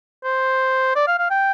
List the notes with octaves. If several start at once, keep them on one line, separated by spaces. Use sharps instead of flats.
C5
D5
F5
F5
G5